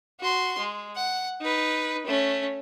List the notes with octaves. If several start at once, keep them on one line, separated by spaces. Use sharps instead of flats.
F#4 C6
G#3
F#5
D#4 B4
A3 C#4